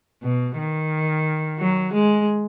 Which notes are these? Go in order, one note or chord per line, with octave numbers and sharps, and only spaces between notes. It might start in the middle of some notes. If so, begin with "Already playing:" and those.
B2
D#3
F#3
G#3